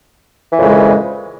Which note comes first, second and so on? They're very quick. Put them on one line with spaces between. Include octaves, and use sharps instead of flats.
E3 F2 A#2 C#3 G#3